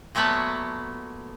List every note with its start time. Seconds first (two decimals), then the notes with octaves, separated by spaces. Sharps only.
0.15 A#2 F#3 A3 B3 B4 A5